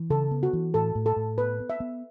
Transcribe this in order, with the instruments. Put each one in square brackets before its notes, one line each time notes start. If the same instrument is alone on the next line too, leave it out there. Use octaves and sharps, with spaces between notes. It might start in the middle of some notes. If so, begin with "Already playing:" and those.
Already playing: [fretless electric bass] E3
[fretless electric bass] C#3 [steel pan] A4
[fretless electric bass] B3
[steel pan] F#4
[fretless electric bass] E3
[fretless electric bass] A2 [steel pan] A4
[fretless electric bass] A2
[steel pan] A4
[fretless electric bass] A2
[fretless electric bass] B3 [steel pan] B4
[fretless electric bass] B3
[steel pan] E5
[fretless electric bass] B3